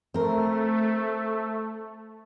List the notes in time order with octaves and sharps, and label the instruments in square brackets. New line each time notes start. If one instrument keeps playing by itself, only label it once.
[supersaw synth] A3 [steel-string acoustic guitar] C4 A#4